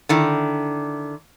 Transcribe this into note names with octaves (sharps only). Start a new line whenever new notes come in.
D3 D#3 E4